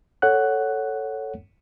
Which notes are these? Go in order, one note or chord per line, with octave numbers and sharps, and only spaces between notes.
A4 C#5 F#5 F#6